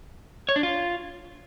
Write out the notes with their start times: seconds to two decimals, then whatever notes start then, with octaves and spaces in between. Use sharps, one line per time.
0.49 C#5
0.56 D4
0.63 F4